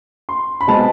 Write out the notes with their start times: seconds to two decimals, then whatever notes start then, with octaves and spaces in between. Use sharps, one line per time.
0.29 C6
0.61 B5
0.67 B2 G#3 C4 A5